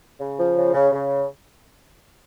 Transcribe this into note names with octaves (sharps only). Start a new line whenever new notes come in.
C#3
F3
C#3
C#3
C#3